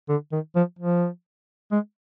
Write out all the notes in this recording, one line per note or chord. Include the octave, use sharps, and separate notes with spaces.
D3
D#3
F3
F3
G#3